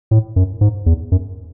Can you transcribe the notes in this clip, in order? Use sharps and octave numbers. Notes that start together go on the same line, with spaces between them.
A2
F#2
G#2
E2
F#2